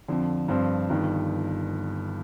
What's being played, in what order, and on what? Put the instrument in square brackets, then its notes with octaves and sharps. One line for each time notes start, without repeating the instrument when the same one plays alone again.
[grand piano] F2 D3 F3
G2 F3 C4
G1 G2 D#3